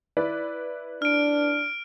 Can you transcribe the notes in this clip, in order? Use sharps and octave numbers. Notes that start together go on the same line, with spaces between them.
E4 B4 D5
D4 F6 D7